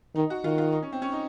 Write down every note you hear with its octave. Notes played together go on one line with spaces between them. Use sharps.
D#3 D#4
F#4
D#3 F4
F4
D#4
C#4
C4
C#4
D#4